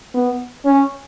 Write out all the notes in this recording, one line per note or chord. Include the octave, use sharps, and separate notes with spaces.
B3
C#4